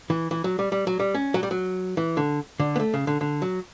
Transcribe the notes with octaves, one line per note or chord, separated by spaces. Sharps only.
E3
E3
F#3
G3
G3
F#3
G3
C#4
F#3
G3
F#3
E3
D3
D3
B3
A3
C#3
D3
D3
F#3